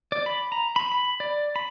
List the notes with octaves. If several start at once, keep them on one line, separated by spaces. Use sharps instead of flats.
D5
B5
A#5
B5
B5
D5
B5